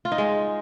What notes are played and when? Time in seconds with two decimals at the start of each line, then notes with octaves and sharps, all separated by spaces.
0.05 F4
0.12 D#4
0.18 G#3